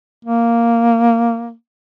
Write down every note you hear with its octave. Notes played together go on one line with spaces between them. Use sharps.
A#3